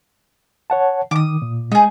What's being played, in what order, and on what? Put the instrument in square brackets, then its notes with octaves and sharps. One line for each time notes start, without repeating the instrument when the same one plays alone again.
[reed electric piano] C#5 F#5 A5
[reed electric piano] D#3 [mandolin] D6 D#6
[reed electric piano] A#2
[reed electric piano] G#3 [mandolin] D#4 G#4